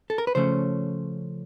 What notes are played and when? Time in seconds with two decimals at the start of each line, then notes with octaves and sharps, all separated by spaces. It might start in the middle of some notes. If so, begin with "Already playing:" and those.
0.10 A4
0.18 A#4
0.27 B4
0.35 C#3 F3 A3 C#4 C5